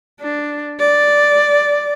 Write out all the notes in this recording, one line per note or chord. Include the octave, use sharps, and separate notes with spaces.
D4
D5